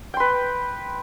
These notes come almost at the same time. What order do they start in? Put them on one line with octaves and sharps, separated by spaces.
G5 C6 B4